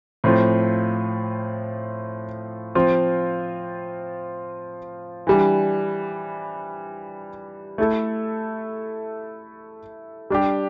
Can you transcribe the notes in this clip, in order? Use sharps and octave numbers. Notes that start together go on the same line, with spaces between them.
A2 F3 C4 F4
F3 C4 F4
E3 G3 D4
A3 E4 A4
G3 D4 G4